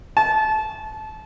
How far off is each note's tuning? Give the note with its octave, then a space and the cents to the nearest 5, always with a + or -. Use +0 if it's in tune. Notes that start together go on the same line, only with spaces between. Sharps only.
A5 -25